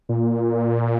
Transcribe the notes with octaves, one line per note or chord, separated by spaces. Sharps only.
A#2